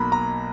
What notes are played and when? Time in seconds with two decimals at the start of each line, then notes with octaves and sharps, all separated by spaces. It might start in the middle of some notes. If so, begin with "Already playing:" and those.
Already playing: B1 B2 F#3 A#3 A#5 B5
0.12 A#5